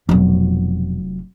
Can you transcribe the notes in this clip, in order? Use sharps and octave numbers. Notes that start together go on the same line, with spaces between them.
F1 F2 B2 F#3